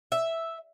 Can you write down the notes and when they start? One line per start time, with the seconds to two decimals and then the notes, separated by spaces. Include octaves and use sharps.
0.12 E5